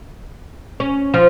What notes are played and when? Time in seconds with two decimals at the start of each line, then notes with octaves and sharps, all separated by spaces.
0.80 C#4
1.14 F3